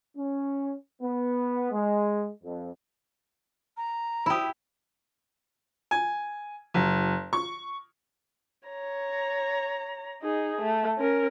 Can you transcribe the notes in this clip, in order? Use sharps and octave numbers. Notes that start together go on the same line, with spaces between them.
C#4
B3
G#3
F2
A#5
E4 G4 B5 D#6
G#5
F#1
C#6
C#5 A#5
D#4 G#4
A3
C#4 A#4